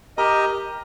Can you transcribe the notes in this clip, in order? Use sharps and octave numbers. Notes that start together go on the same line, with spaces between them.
G4 A#4 D#5 A#5